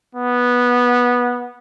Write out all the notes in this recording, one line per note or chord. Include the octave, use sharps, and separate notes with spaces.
B3